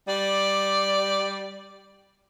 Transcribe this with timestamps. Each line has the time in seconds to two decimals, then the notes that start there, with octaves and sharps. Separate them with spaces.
0.07 G3 D5